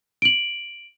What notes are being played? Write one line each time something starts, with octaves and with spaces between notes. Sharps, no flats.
D7 F#7